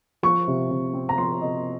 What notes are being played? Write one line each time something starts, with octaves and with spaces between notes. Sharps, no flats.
F3 C#6
C3
C3
C4
A#5
F3 C6
C3 D#5